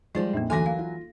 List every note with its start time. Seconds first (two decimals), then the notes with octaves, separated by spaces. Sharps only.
0.15 F3 G3 G#3 F4 C5 D5
0.33 A#1 F2 A#3 D#4
0.50 D2 E3 F#3 A4 G#5 C6 D6 A#6
0.66 A#3 F5
0.79 F4